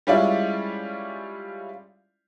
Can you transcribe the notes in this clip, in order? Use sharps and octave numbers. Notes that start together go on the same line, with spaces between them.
G3 G#3 C#4 E4 F4 D5